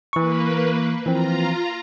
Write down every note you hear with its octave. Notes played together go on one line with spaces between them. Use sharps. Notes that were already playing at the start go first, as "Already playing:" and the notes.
E3 A#3 B4 C#6
E3 F3 C4 F4 A#5